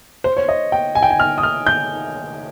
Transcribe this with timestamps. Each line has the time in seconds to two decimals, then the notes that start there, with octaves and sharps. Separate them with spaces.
0.24 C5
0.37 C#5
0.49 D#5
0.72 G5
0.95 G#5
1.03 G5
1.11 G#5
1.20 F6
1.38 D#6
1.43 F6
1.67 G6